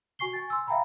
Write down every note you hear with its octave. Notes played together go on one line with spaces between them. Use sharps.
F#4 G#5 C#6 C7 G7
G#5 A6
C6 E6
E5 F5 G5 G#5 A#5 B5